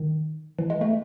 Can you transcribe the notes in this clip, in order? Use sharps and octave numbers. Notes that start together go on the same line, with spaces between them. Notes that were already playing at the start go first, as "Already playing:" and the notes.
Already playing: D#3
E3
G#3
A3